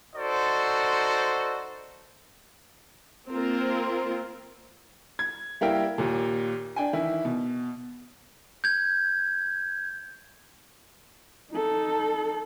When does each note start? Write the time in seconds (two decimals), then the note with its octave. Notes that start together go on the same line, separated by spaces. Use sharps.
0.16 D#4 F#4 A4 C5 D5
3.30 A#3 C4 F4 A#4
5.19 G#6
5.61 G3 A#3 E4 A#4 F5 G5
5.98 D#2 A#2
6.76 D4 G5 G#5
6.93 D#3 E3 E4
7.25 B2
8.64 G6 G#6
11.51 D#4 A4